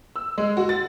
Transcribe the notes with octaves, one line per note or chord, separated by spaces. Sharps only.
E6
G#3
F#4
A6